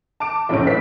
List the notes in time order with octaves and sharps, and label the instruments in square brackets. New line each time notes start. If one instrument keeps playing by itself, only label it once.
[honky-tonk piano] A5 D6 D7
F1 A#1 A2 C#3 C#4 D7
F#1 B4 B6